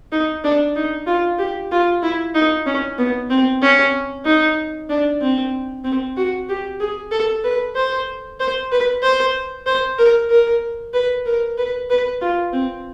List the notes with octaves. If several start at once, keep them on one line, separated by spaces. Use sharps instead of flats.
D#4
D4
D#4
F4
G4
F4
E4
D#4
C#4
B3
C4
C#4
D#4
D4
C4
C4
F#4
G4
G#4
A4
B4
C5
C5
B4
C5
C5
A#4
A#4
B4
A#4
B4
B4
F4
C4